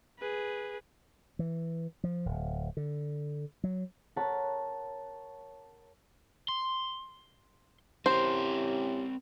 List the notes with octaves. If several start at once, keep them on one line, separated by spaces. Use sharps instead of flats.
G#4 B4
E3
F3
D1
D3
F#3
A#4 C#5 F#5 A5 B5
C6
C4 C#4 E4 G4 A#4 C5